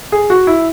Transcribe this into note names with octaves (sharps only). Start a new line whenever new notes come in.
G#4
F#4
E4